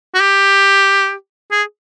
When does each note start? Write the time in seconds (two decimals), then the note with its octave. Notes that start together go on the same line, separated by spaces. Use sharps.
0.14 F#4
0.20 G4
1.51 G#4